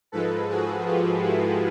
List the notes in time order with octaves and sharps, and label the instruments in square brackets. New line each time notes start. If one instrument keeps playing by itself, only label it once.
[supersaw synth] G#2 F3 G#3 A4 B4
F#4 G#4
F4 G4
E4 F#4